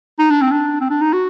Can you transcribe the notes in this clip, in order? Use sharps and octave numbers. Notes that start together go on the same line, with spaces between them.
D#4
D4
C4
D4
C4
D4
D#4
F#4